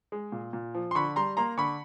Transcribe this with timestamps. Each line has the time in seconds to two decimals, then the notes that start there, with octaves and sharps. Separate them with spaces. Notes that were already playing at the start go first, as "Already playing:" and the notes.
0.12 G#3
0.32 A#2
0.53 A#2
0.74 F3
0.91 C6
0.95 D3 B5 C#6
1.16 G3 A#5 C6
1.37 A#3 A#5 C6
1.57 D3 B5 C#6